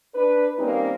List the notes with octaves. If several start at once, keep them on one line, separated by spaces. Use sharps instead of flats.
D4 B4
D#3 G3 A#3 C4 C#4 D#4